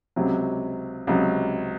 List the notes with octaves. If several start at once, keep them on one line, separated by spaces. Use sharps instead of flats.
C#2 C3 F#3
C#2 C3 F#3